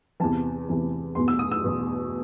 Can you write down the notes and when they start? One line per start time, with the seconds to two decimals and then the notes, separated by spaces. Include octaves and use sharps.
0.20 E2 C3 E3 A5
0.69 E2 C3 E3
1.15 E2 B2 C6
1.28 E6
1.39 D#6
1.51 E6
1.64 E2 B2